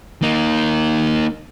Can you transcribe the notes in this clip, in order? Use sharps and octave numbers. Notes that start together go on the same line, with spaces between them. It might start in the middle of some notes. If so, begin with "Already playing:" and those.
A#3 D#4